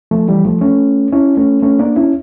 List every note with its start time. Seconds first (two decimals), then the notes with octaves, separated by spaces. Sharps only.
0.11 F3 A3
0.28 E3 G3
0.45 F3 A3
0.61 A3 C#4
1.12 C#4 E4
1.37 A3 C#4
1.62 A3 C#4
1.79 A#3 D4
1.96 C#4 E4